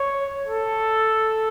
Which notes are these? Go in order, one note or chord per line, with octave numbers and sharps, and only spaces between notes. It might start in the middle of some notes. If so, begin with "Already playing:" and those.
Already playing: C#5
A4